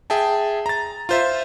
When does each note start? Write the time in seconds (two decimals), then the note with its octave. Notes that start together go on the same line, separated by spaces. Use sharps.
0.10 G#4 E5 G5 A5
0.66 A#5 A6
1.09 F4 C5 E5